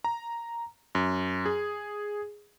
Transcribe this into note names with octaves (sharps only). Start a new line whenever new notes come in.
A#5
F#2
G#4